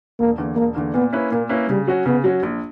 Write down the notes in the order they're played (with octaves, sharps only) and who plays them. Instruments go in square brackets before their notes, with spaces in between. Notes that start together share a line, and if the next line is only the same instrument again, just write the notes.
[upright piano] E1 [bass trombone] A#3
[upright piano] E2 D3 A#3
[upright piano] E1 [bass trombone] A#3
[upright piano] E2 D3 A#3
[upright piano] A#2 [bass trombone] B3
[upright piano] A#3 C#4 E4 B4
[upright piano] A#2 [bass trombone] A#3
[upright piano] A#3 C#4 E4 B4
[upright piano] C#3 [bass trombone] G3
[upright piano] F#3 C#4 F#4
[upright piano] C#3 [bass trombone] B3
[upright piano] F#3 C#4 F#4
A#1